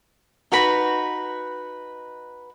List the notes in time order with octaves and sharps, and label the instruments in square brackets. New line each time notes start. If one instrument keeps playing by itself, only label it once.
[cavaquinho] D#4 F#4 B4 B5